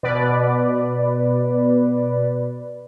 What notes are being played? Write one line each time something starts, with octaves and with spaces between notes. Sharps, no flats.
B2 B4 D5